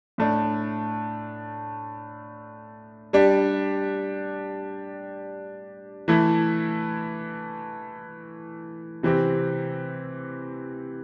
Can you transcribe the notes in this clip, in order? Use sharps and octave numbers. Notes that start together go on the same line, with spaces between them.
A2 A3 D4
G3 D4 G4
E3 A3 E4
C3 E3 C4 G4